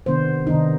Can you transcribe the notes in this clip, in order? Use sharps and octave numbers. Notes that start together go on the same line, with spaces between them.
C3 D#3 B3 D4 C5
C3 D#3 B3 D4 D#4